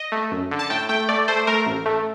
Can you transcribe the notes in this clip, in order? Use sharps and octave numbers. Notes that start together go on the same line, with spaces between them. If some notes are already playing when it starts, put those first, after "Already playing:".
Already playing: D#5
A3
F#2
D3
A5
A2 G5
A3 G5
A3 D5
A3 C5
A3 A#4
A1
A3